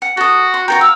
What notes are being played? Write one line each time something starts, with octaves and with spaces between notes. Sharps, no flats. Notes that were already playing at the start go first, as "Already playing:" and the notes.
F#5
F#4 A4 D#6
C6
F#4 A4 G5 A#5
F5 E6